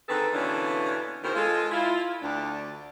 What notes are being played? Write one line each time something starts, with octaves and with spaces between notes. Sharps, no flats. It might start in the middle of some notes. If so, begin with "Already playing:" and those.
D3 D#3 C4 G#4 A4 B4
B2 D3 E3 A#3 C#4 D4
E2 B2 D#3 A#4 C5
G#3 F4 A4
E4 F4
D2 D4